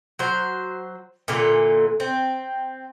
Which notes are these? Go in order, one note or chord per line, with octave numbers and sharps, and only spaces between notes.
F#3 C5
A#2 D3 E3 A4
C4